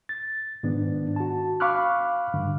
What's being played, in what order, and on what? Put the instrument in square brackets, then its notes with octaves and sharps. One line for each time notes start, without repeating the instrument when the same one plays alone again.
[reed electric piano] A6
G#2 D#3 B3 D4
F#4 A5
F5 B5 C#6 D6 F6 F#6
G2 D3